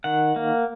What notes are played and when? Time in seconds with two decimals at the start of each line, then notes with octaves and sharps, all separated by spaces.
0.04 D#3 F#5
0.36 A#3